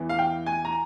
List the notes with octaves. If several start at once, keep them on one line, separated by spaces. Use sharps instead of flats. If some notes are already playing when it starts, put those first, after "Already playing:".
Already playing: E2 E3
F5
G5
G#5
A#5